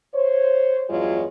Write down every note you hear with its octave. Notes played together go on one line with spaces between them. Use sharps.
C5 C#5
E2 G2 F#3 G#3 F4 C#5